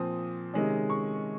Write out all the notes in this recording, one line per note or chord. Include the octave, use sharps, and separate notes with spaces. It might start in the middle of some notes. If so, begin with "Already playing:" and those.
Already playing: A#2 F3 C4 D#6
C3 D#3 G#3 C#4
C#6